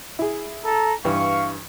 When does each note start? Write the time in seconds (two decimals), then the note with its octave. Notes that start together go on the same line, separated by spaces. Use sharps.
0.19 E4 G#4
0.64 A4 A#5
1.05 G2 E3 F5 C#6